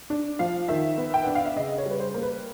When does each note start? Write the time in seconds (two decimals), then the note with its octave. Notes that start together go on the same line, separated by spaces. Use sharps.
0.10 D4
0.39 F3 F5
0.68 D#3 E5
0.98 B3
1.14 G5
1.24 D4 F#5
1.35 F5
1.45 E5
1.56 C#3 D#5
1.78 C#5
1.86 G3 B4
2.00 C5
2.14 A#3
2.22 B4